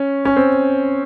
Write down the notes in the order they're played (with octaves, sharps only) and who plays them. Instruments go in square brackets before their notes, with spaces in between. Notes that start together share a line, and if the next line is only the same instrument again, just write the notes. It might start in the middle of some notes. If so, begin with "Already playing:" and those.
Already playing: [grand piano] C#4
C#4
C4